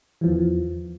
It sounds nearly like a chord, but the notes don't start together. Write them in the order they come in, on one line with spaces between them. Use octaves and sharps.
E3 F3 E2